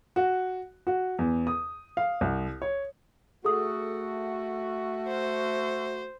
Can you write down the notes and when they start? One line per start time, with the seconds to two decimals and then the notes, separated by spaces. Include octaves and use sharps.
0.16 F#4
0.87 F#4
1.19 E2
1.47 D#6
1.97 F5
2.21 C2
2.62 C#5
3.45 A3 F#4 G#4 A4 D#6
5.08 C5